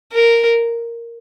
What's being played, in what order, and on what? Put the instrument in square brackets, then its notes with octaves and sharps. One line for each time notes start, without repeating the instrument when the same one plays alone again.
[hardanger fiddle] A#4